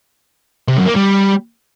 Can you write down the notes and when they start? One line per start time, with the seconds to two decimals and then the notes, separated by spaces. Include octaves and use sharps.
0.68 C3
0.77 F#2
0.87 A#3
0.96 G3